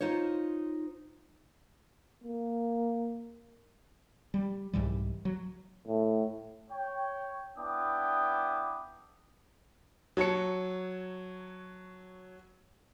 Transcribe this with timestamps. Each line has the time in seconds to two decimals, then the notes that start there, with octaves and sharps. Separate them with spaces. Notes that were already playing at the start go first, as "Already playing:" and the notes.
0.01 D#4 F4 C5 C#5
2.24 A#3
4.34 G3
4.73 C2 G#2 E3 G3
5.25 F#3
5.88 A2
6.71 C#5 G5
7.58 B3 D4 E4 G5 D6 D#6
10.17 F#3 C#5 A5 C#7